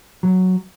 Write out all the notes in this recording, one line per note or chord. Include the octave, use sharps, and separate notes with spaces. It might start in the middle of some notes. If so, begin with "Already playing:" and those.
F#3